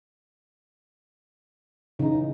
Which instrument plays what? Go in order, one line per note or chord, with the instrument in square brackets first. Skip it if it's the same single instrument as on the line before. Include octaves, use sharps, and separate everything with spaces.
[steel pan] C#3 E3 [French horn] D#4